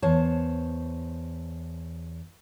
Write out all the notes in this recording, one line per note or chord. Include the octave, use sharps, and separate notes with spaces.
E2 C5 C#5 A5